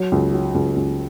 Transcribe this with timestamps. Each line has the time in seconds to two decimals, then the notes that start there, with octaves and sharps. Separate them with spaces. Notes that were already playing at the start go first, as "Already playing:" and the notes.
Already playing: F#3
0.12 C#2
0.33 F#3
0.55 C#2
0.76 C#2